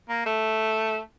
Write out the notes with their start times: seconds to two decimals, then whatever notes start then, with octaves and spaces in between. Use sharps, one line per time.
0.09 A#3
0.26 A3